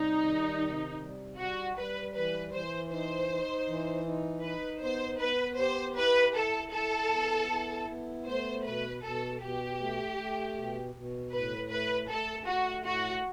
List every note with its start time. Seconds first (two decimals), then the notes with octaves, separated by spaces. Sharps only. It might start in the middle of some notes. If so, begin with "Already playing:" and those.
Already playing: C3 G3 D#4
0.23 D#3
0.62 C3
1.00 G3
1.38 G3 F#4
1.76 G3 B4
2.15 E3 B4
2.53 E3 C5
2.91 D#4 C5
3.30 D#4
3.68 E3
4.05 D#4
4.44 D#4 B4
4.82 B3 C5
5.20 B3 B4
5.59 G4 C5
5.97 E4 B4
6.35 E4 A4
6.73 E4 A4
7.11 B3
7.50 E4
7.88 B3
8.27 A3 C5
8.65 B2 B4
9.03 B2 A4
9.41 B2 G4
9.79 A3
10.18 A3
10.56 B2
10.94 B2
11.32 A2 B4
11.71 A3 B4
12.09 A3 A4
12.47 A3 F#4
12.85 A2 F#4